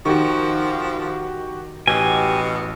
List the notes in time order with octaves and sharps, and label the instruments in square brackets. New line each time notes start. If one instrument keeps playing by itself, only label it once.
[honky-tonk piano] D#3 [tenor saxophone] F3 [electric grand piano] F#4 G4 C#6
[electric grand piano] A1 [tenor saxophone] B2 [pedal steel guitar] G4 G#5